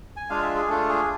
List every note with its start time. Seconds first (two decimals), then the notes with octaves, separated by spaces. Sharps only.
0.16 G#5
0.30 G#3 D4 F4 F5
0.42 E5
0.56 G#4
0.69 A3 D4 F4 A4
0.89 G#4